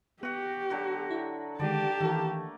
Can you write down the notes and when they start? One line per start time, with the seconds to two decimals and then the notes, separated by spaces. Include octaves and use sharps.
0.23 B3 F#4 G4 F#5
0.70 D3 F#3 F#4
1.11 E4
1.60 D3 D#3 G#3 G4 D5 A5
2.01 D#3 E3 A3 A#3 A4